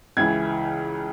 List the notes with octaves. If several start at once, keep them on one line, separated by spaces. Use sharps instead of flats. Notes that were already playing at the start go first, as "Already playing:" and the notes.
C#2 C#3 E3 G#6